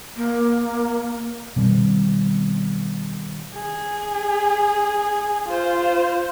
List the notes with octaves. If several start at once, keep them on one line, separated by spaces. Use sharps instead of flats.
A#3
B2 D#3 G3 C4
G#4
F4 C5